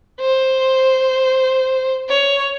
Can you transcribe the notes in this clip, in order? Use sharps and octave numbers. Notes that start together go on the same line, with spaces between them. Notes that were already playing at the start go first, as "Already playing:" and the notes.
C5
C#5